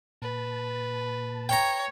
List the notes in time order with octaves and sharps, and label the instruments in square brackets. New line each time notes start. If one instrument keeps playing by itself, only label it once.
[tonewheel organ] A#2 A5 [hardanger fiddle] B4
[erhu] C#5 [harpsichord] G5 A#5